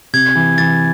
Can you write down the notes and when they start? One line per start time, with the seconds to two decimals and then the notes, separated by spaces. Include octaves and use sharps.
0.13 C3 G#6
0.35 E3
0.58 E3 A6